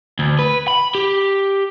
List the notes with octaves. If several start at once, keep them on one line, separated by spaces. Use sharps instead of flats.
D2
B4
B5
G4